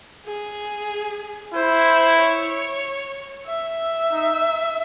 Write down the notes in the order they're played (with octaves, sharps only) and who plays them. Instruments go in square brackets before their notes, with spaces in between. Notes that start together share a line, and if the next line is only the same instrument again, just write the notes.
[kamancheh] G#4
[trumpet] E4 [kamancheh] C5
[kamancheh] C#5
E5
[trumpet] D#4